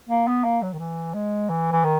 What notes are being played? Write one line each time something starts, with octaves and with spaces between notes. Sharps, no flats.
A#3
B3
A#3
F#3
D#3
E3
G#3
E3
E3
D#3